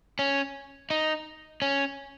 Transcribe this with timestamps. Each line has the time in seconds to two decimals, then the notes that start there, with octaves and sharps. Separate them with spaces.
0.19 C#4
0.90 D#4
1.62 C#4